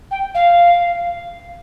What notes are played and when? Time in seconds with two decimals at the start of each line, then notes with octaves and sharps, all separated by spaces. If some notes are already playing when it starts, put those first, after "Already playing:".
0.10 G5
0.34 F5